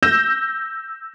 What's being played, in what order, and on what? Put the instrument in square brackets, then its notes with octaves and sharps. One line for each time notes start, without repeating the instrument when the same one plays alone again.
[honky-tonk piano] E6 G6 A#6 E7